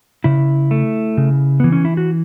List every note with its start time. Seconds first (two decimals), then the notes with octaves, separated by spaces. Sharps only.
0.24 C#3 E4
0.71 A3
1.17 C#3
1.60 E3 B3
1.72 C#4
1.85 E4
1.97 F#4